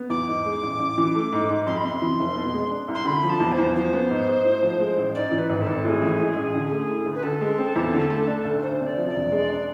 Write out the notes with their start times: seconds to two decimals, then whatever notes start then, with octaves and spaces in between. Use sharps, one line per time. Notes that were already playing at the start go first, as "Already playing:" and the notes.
Already playing: B3
0.10 E2 D6
0.28 G#2
0.45 G#3
0.63 A1
0.79 A1
0.98 E3
1.15 A3
1.33 G#2
1.49 G#2
1.66 F2 C6
1.76 B5
1.83 C3 C6
2.02 E3
2.19 F1
2.36 B2
2.54 G#3
2.71 D4
2.88 C2
2.94 C6
3.05 D3 B5
3.23 F3
3.29 A5
3.40 E2
3.52 C5
3.58 E2
3.76 F3 C5
3.93 B3
4.10 G#2
4.27 G#2
4.44 A2
4.63 F3
4.80 G#3
4.97 A1
5.14 G#2 D5
5.31 E3
5.38 B4
5.49 G#1
5.61 G#1 A4
5.84 A2 G#4 A4
6.02 E3
6.19 G#3
6.36 A1
6.54 D3
6.71 A3
6.89 E4
7.06 D2
7.14 B4
7.23 D3 A4
7.41 G#3
7.58 C4
7.76 E2
7.93 D3
8.10 A3
8.27 D4
8.45 D2
8.62 D2 C5
8.80 C3
8.86 D5
8.98 F3
9.09 D5
9.14 E1
9.32 G#3
9.50 D4